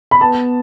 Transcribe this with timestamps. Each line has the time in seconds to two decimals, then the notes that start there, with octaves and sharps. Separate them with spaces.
0.11 B5
0.20 B3 A5